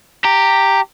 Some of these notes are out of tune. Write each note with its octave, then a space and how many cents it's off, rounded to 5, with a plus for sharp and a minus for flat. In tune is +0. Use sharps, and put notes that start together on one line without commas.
G4 +0 A#5 -20